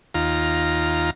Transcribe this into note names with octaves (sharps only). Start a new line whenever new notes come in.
D#2 F4 A#5